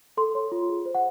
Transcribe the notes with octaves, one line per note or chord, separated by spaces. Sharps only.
A4 C6
C#5
F4
G#4
C5
F#5